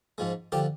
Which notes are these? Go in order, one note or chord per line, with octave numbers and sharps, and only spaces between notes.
G#2 F3 G#3
D3 F3 G4